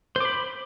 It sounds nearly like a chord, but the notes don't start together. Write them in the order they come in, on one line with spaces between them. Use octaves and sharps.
C5 D6 B5